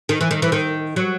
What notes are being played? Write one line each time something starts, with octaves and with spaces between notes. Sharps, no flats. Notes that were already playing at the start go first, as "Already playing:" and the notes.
D#3
E3
D#3
E3
D#3
F#3